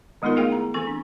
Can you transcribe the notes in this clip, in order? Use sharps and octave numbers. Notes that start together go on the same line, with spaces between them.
D#3 G#3 B3 D#4 F4 A#4
A3 D#4 E4 G#4 F5 G5
A#5
E3 C4 A4 C#6
D4